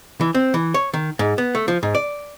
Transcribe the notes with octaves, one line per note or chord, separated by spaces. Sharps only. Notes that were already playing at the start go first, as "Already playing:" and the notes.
E3
C4
E3
C#5
D#3
G#2
B3
A3
F3
G#2
D5